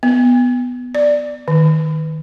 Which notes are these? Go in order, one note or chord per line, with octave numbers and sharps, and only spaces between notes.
B3
D5
D#3